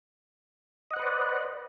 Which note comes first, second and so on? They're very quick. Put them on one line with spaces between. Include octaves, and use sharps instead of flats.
D#5 F#5 C5 B4 D5